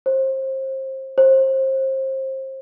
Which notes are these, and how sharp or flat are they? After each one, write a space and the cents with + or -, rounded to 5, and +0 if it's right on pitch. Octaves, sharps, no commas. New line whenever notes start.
C5 +30
C5 +30